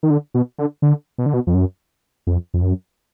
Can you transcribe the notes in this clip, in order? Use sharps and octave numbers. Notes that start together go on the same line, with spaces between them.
D#3
D3
B2
D3
D3
B2
D3
B2
F2
F#2
F2
F2
F#2